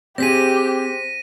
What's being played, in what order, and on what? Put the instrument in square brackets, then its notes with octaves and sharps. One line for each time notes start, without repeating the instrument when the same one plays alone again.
[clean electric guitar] C4 G#4 [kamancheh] G4 [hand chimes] C5 [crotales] A#6 B6 D#7